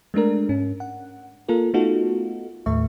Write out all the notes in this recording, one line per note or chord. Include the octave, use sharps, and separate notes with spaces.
G#3 A3 D4 A#4
G#2 C#4
F#5
A#3 F4 A4 A#4
A3 B3 D#4 F4 F#4 A4
D#2 A2 A3 E5 C#6